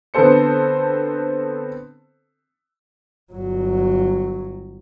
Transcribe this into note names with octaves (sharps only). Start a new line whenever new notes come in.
D3 B3 C4 A4 C5 C#7
G1 F#3